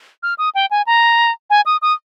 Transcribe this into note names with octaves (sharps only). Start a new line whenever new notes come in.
F6
D#6
G5
G#5
A#5
G#5
D#6
D#6